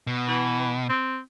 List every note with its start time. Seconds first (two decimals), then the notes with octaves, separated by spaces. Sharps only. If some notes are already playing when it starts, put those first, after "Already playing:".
0.07 B2
0.28 E3
0.89 C4